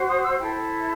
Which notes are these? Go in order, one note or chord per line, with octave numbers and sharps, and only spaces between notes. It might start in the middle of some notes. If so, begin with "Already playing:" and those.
Already playing: F#4 C5
D#6
E6
E4 A4 C5 G5